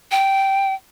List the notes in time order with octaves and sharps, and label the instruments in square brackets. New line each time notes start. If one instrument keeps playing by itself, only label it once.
[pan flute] G5